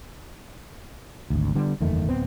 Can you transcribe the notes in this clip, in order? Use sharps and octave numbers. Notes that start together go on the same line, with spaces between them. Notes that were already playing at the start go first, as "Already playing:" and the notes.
G#1 D2
D3 G3 B3
F#1 E2 D#3 A3
D1 B3 C4